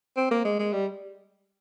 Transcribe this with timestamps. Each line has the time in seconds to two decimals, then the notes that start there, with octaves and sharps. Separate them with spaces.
0.17 C4
0.31 A#3
0.45 G#3
0.59 G#3
0.73 G3